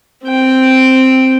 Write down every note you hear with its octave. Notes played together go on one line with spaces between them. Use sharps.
C4 G5